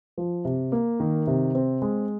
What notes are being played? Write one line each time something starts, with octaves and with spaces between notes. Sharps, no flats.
F3
C3
A#3
D#3
C3
C4
G#3